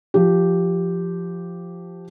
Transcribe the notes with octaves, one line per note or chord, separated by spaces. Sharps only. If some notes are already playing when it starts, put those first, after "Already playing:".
F3 G4